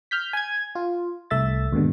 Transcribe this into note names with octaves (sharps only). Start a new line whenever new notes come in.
F6 G6 B6
G#5 G#6
F4
C2 A3 E5 A6
D#2 G#2 B2 D3